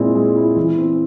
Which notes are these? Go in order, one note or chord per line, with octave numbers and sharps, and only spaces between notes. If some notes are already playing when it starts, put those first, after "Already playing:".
Already playing: A#2 G#3 C4 E4
G#3
E4
E3
C4